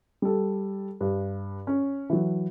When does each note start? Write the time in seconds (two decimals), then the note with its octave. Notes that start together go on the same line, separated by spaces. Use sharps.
0.22 G3 A4
1.01 G2
1.67 C#4
2.10 E3 F#3